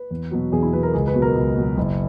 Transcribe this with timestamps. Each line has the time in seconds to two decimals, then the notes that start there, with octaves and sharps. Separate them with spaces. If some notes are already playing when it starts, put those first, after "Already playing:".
Already playing: B4
0.11 E2
0.31 B2 F#3
0.52 E2 G#4
0.63 E4
0.73 B2 F#3 B4
0.83 A#4
0.93 C#2 G#4
1.08 B4
1.14 B2 F#3
1.22 A#4
1.35 C#2
1.56 B2 F#3
1.77 F#1